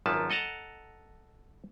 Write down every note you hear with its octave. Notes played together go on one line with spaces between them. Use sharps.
G#1 F#2 F3 F#3 B4 A5
A4 D#5 F#5 A5 A#5